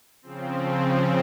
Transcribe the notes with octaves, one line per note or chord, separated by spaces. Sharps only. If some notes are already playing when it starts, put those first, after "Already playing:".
C#3 F3 C4